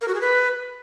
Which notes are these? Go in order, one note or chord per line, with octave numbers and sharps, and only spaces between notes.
A#4
F#4
G#4
B4